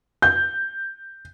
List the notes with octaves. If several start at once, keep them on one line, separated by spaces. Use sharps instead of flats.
G6